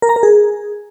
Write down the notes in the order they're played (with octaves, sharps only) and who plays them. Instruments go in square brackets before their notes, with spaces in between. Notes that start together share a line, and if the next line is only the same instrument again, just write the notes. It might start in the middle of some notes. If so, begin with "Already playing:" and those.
[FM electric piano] A#4
A#5
A#4
G#4